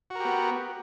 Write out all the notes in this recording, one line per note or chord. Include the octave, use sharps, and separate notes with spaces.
B3 F#4 G4 A#4